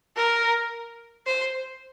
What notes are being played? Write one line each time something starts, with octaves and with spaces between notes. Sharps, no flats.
A#4
C5